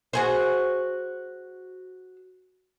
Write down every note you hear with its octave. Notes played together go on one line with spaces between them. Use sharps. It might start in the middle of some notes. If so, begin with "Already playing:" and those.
F#4 G#4 C5